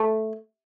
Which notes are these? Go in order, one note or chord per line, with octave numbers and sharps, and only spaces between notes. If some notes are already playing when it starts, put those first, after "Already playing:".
Already playing: A3